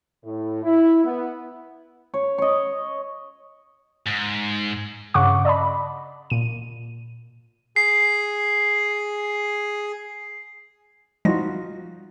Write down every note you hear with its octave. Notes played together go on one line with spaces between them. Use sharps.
A2
E4
B3
C#5
C#5 D#5
G#2
G2 C#3 F#5 C#6 D6
D5 D#5 A5 B5
A#2 D#7
G#4 C7
F3 G3 D#4 F4 F#4 A#6